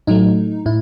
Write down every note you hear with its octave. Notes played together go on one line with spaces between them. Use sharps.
A2 F#3 A3 D#4
A2 E4